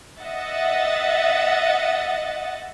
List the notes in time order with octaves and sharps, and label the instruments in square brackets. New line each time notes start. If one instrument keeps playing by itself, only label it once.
[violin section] D#5 E5 F#5 A6